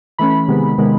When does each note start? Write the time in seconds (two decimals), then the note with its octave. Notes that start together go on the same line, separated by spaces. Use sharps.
0.18 E3 A3 C#4 B5
0.48 C3 D#3 G#3 B3
0.78 C3 D#3 G#3 B3